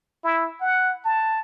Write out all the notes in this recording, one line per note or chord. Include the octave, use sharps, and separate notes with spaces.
E4
F#5
A5